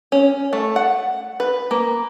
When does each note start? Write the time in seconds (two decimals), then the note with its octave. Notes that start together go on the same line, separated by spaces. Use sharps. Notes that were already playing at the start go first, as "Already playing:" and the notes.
0.12 C#4
0.53 A3
0.76 F#5
1.40 B4
1.71 A#3